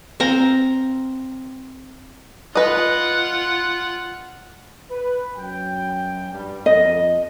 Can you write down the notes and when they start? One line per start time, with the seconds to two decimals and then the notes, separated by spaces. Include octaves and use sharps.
0.20 C4 F5 A#5
2.55 F4 B4 D#5 F#5
4.90 B4
5.36 F#2 G5
6.32 G2 G3
6.66 F2 D#5